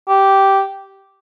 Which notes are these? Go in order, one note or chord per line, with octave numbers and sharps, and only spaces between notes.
G4